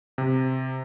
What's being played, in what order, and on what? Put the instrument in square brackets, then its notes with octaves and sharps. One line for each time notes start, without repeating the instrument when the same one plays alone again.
[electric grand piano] C3